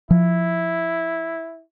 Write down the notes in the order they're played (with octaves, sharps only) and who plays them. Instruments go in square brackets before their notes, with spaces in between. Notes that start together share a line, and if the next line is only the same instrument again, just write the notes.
[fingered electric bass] F3 [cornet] E4